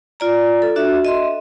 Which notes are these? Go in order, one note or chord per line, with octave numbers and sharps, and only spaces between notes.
F4 D5 A#5
A4
D4 F#4 E5
D#5 E5 C6